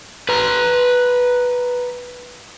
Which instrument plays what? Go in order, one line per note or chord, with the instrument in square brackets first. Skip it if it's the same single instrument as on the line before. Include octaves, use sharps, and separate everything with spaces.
[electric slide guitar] B4 A#5